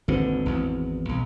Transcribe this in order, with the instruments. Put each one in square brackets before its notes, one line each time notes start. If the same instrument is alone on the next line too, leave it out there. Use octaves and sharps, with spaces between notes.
[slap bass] G#1 D#2 D3 [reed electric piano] C4 F#4 B4
[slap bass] G#1 E2
[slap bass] B1 [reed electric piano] B2